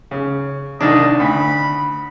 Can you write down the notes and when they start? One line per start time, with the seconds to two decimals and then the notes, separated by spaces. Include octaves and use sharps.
0.11 C#3
0.81 C2 D#3 D4 D#5
1.20 D2 B5